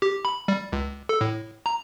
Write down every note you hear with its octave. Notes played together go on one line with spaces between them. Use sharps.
G4
B5
G3
C#2
A4
A2
A#5